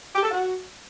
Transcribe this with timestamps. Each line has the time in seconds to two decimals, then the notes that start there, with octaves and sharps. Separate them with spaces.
0.15 G4
0.23 A4
0.31 F#4